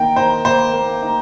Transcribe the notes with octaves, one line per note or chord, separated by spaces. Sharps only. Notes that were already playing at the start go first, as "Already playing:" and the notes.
Already playing: D#3 A#3 G5
D#4 C5
A#3 C5
A#3
D#4